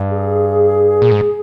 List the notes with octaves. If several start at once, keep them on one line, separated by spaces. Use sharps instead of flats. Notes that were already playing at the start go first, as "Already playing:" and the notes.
Already playing: G2
G#4
A#2
G#2